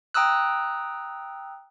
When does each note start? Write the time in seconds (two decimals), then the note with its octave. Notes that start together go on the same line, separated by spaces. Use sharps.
0.14 G5 A#5 D#6 E6 F#6